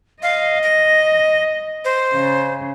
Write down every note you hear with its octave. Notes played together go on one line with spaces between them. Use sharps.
D#5 F5
A#6
C5
C#3